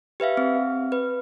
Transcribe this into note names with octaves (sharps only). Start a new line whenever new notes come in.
G4 B4 E5 F5
C4
B4